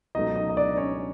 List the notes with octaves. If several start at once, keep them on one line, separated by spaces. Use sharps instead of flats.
C#2 B2 F#3 A3 D#4 D#5
D#4 D#5
D#5
D4 D5
C#4 C#5